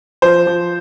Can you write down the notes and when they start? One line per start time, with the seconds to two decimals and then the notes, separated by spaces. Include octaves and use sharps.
0.22 F3 C5
0.47 F3